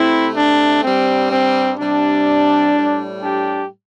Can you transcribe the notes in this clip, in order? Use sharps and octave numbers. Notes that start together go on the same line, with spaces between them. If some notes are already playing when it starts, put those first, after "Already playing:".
Already playing: C3 A3 C4 E4
D4
G2 G3 C4
C4
C3 G3 D4
A2 G3
D4 G4